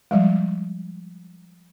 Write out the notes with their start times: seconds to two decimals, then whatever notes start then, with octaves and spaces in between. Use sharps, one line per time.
0.11 F3 G3 G#3